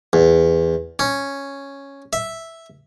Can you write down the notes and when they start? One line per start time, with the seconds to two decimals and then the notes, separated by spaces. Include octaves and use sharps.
0.13 E2
0.99 C#4
2.13 E5